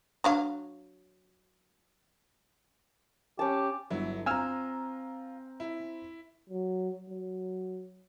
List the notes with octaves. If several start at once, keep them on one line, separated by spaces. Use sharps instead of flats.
F#3 D4 F5
C#4 G4 A5
G1 F#3 E4
C4 F4 G#5 A#5 E6 F6
E4
F#3
F#3